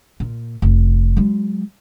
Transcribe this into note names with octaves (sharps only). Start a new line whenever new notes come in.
A#2
F1
F#3 G#3